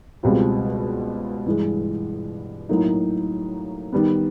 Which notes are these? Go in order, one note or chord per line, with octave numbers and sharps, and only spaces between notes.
C#2 B2 G3 C4 F4
G2 E3 G#3
A2 F#3 A#3 D#4
D#3 G3 B3